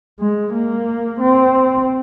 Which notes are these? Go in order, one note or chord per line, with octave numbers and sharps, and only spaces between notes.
G#3
A#3
C4